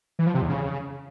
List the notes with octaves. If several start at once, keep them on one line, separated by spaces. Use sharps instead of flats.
E3
F3
C3
E2
C#3